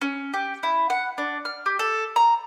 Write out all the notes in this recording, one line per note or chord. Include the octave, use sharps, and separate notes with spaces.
C#4
G4
E4
F#5
D4
F6
G4
A4
A#5